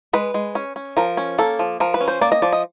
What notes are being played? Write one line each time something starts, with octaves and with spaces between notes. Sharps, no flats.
G#3 B4
G#3
C#4
C#4
F3 A#4
C#4
A#3 A4
F3
F3 A#4
B4
C#4
C5
A#3 D5
D#5
F3 D5
D#5